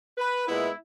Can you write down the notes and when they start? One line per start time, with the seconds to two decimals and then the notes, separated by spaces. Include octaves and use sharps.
0.18 B4
0.47 A#2 G#3 B3 E4